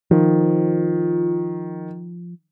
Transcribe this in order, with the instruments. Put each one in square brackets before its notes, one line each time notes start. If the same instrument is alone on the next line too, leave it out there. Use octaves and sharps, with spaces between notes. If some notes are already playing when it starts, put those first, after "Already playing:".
[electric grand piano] D#3 [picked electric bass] F3